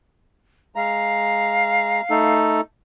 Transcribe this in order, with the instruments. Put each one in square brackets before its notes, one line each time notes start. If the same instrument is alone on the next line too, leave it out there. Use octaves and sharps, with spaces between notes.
[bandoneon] G#3 A#5 [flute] F5
[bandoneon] A3 D#4 A4